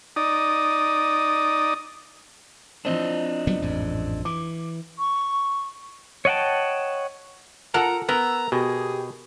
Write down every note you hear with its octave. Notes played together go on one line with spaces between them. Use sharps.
D#4 D5 D#6
F3 C4 D4 D#5
F#3 G3 B3
A1 F2 G#2
E3 D6
C#6
C#5 D#5 F#5 G5 A5
F4 A4 A#4 F#5 A#5
B3 A#4 A#5 E6
B2 G4 G#4